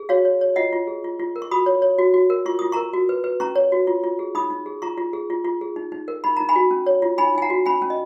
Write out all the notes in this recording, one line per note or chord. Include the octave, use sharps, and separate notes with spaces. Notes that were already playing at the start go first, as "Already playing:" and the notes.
Already playing: G#4
F#4 C#5 F5
C#5
C#5
F4 D#5 F#5
F4
G#4
F4
F4
A#4
C#6
F#4 B5 D#6
C#5
C#5
F#4
F#4
A#4
F4 C#6
F4 D#6
A#4 A#5 C#6
F#4
B4
B4
C#4 A#5 C#6
C#5
F#4
F4
F4
G#4
D#4 B5 D#6
D#4
G#4
F4 A#5 C#6
F4
G#4
F4
F4
G#4
D#4
D#4
A#4
D#4 B5
D#4 A#5
G#5 B5
F#4
C#4
C#5
F4
D#4 G#5 B5
D#4 G#5
F#5 A#5
F#4
C#4 G#5 B5
C#4
D#5